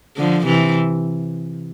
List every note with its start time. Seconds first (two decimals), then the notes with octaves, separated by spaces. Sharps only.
0.17 D3 F3
0.46 C3 E3